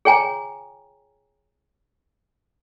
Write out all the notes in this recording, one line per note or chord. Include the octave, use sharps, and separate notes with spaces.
G#4 C#5 G5 G#5 A#5